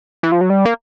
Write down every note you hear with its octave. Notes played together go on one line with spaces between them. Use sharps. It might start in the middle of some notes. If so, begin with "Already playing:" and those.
E3
F3
F#3
G3
A#3